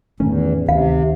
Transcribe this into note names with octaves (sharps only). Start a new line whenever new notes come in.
E2 A2 D#3 A3 C#4
D2 C3 D#3 F5